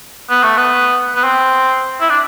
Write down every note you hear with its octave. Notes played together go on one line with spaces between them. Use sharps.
B3
A3
B3
B3
C4
E4
D4